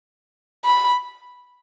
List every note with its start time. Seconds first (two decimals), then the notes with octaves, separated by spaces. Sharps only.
0.65 B5